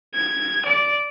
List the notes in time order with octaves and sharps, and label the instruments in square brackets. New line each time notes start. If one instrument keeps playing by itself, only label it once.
[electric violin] G#6
D5